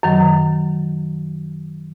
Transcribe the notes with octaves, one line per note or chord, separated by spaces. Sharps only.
F#2 D#3 F#3